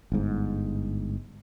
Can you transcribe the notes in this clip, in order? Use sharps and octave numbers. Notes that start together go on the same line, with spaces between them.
G1 G#2